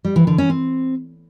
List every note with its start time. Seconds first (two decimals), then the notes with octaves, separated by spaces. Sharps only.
0.05 G3
0.16 E3
0.27 D3
0.38 C#4
0.50 C4